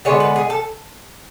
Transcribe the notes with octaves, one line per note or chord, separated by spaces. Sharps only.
D3 G#3 B3 C#5
B4
G#4
A4